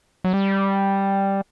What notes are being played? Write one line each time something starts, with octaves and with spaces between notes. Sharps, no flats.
F#3
G3